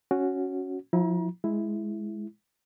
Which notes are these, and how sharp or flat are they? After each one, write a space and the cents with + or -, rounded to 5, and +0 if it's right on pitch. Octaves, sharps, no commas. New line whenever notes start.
C#4 +0 F#4 +0
F3 +30 E4 -15 A#5 +35
G#3 +10 E4 +0